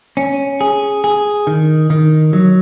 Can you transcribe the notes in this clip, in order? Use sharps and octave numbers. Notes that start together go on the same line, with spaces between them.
C#4
G#4
G#4
D#3
D#3
F#3